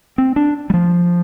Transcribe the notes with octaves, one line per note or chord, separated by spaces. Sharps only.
C4
D4
G3
F3